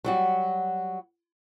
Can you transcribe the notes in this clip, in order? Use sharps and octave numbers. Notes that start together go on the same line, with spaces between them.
F#3 G3 F#4